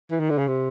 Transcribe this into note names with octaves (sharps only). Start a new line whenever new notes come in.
E3
D#3
D3
C#3
C3